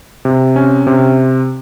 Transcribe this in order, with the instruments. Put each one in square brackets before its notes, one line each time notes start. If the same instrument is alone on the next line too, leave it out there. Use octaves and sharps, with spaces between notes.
[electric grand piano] C3
C#4
C3